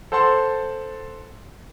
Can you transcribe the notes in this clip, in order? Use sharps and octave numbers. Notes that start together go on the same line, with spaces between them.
A4 C5 F#5 A5 C6